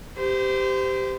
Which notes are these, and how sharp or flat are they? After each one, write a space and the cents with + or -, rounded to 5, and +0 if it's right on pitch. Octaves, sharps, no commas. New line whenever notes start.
G4 +0 C5 -30